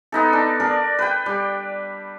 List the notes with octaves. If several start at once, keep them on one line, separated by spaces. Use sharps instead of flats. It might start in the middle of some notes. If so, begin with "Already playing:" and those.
B3 D#4 A4
D4
D4 A#4 D5
B4 G5
G3